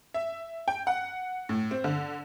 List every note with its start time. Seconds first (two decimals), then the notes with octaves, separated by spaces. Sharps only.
0.14 E5
0.68 G5
0.87 F#5
1.49 A2
1.71 C4
1.84 D3